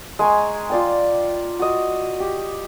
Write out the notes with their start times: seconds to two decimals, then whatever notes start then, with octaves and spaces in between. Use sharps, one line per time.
0.19 G#3 G#5 A#5 C#6
0.70 F4 D5 G5
1.59 F#4 D#5
2.20 G4